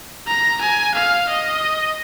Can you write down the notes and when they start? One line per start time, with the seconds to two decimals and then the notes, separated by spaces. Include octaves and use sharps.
0.27 A#5
0.61 G#5
0.94 F5
1.29 D#5